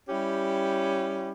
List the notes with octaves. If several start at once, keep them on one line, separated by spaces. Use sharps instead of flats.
G3 C#4 E4 G4